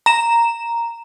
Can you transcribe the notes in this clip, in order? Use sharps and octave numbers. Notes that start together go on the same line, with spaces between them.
A#5 E7